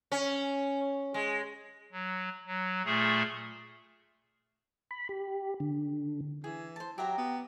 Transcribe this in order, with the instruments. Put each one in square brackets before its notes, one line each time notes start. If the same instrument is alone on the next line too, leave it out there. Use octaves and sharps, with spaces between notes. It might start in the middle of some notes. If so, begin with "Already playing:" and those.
[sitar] C#4
G#3
[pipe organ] F#3
F#3
A#2 A3 G#4
[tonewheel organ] B5
G4
D3
[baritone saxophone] E3 [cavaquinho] G#4
[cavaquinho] C5 A5
[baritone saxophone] F#3 [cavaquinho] G4 E5 A#5
[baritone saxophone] B3